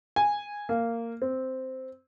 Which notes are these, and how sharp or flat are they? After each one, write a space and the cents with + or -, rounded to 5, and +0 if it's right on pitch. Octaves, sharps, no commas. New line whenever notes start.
G#5 -10
A#3 -15
C4 -5